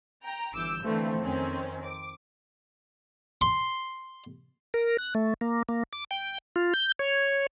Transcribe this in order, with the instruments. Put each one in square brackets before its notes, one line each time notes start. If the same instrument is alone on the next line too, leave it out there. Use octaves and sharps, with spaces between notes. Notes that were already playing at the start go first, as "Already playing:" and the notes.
[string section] G5 A#5
G1 E3 D6 E6 G6
D3 E3 F3 A3 C4
F2 D#3 C4 C#4
D6
[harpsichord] C6
[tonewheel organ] A#4
F#6
A3
A#3
A#3
D6
G5
F4
G6
C#5